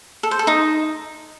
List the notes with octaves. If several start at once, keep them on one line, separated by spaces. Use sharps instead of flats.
A4
C5
A4
D#4